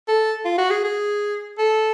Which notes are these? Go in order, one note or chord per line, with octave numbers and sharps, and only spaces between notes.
A4
F4
F#4
G#4
G#4
A4